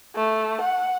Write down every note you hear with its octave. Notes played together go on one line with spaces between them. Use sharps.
A3
F#5